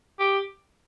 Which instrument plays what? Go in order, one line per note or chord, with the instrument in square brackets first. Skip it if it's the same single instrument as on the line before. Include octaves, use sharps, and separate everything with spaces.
[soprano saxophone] G4